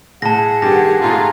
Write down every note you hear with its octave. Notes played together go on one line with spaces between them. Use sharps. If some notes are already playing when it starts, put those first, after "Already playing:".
A2 G#4 F#5 A5 A#6
G2 D#3 G4 A#6
G#2 A3 F4 G#4 A#5